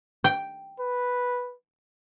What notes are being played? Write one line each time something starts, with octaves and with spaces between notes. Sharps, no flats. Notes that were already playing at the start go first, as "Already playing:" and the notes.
G5
B4